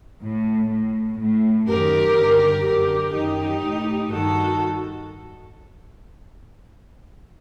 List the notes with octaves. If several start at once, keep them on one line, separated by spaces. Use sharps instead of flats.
A2
A2
A2
F#2 D#3 G4 A#4
G2 D3
F#2 D3 G4 A#4
F#2 D#3 D#4 G4
A2
G2 D#3 F#4 A4